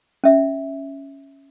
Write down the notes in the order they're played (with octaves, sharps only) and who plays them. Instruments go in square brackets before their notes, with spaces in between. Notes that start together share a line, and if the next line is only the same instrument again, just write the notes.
[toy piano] C#4 E5